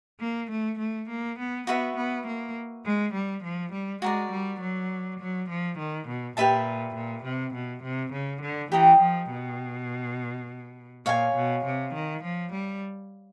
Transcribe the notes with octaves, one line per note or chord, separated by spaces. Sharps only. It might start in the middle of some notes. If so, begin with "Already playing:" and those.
A#3
A3
A3
A#3
B3
B3 F#4 B4 E5
B3
A#3
G#3
G3
F3
G3
G#3 F#4 A#4 D5
G3
F#3
F#3
F3
D#3
B2
A#2 G4 B4 E5 A5
A#2
C3
B2
C3
C#3
D3
E3 G4 A#4 D#5 G5
F3
B2
A#2 C#5 F5 G#5
B2
C3
D#3
F3
G3